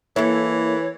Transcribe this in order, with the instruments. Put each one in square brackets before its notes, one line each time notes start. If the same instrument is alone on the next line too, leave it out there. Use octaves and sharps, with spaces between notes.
[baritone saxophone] E3 [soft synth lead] A#3 [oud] E4 A4 [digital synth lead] C#5